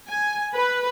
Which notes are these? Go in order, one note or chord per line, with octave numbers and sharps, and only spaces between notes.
G#5
B4